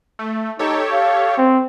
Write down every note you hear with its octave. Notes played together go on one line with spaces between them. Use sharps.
A3
D#4 G4 A4 C#5
F5
C4